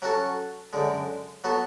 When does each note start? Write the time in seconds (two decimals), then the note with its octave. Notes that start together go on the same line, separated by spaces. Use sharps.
0.02 F#3 C#4 F#4 A4
0.73 F#2 D3 G#3
1.44 F#3 B3 F#4 A4